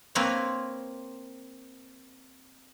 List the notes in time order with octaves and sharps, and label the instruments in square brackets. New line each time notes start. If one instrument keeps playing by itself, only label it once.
[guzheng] A#3 C4 A#4 B4 C#5